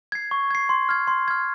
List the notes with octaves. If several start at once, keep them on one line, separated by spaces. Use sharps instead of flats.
G#6 C7
C#6
G#6 C7
C6
F6 G#6
C6
F6 G#6